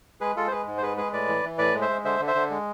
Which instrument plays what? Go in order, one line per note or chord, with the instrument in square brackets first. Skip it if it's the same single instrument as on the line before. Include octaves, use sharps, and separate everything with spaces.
[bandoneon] G#3 G#4 B4
G#3 F4 A4
C5
G#3 G#4 B4
G#2
C5
G#3 G#4 B4
G#3 G#4 B4
A2 B4 D5
E3
E3
A2 B4 D5
G#3
C5 E5
G#3
D3 C5 E5
D3
C5 E5
D3
G#3